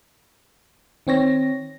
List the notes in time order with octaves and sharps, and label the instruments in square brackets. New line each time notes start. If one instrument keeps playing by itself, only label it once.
[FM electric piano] D#3 C4 C#5 A#6